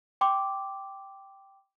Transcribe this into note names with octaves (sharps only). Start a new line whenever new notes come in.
G5 C6 D6